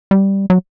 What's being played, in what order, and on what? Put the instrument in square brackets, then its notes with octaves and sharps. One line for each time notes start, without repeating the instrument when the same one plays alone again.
[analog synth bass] G3
F#3